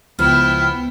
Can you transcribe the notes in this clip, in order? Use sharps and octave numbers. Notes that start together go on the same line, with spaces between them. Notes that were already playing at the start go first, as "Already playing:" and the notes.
C#2 F3 B3 E4 G5 F6